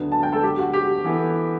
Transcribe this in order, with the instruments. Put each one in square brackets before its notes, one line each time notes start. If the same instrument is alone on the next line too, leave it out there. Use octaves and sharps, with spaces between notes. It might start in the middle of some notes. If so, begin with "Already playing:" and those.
Already playing: [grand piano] D2 D3 F#3 B3 D4
[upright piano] A5
G5
A4
G4
F#4
G4
[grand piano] E3 B3 E4 A4